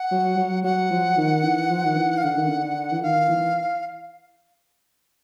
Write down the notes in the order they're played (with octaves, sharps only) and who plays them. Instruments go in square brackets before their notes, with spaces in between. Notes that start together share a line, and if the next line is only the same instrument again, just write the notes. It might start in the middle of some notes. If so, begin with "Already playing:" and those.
Already playing: [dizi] F#5
[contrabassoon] F#3
F#3
[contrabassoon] F#3 [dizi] F#5
[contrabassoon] F3
D#3
E3
F3
D#3
E3
[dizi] F5
[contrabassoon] D3 [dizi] F#5
[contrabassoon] D#3
D3
E3
[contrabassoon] D#3 [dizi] F5
[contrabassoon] E3